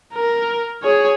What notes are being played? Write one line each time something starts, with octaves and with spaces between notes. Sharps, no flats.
A#4
G#4 C#5